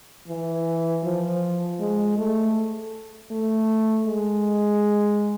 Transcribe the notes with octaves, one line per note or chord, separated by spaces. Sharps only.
E3
F3
G#3
A3
A3
G#3